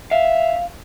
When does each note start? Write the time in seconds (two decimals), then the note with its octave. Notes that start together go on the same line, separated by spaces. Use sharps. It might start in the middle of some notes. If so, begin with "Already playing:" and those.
0.11 E5 F5